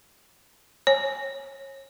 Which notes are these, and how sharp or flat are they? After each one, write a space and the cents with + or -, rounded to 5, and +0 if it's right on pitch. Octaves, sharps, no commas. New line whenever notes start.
C#5 -25 G#5 +15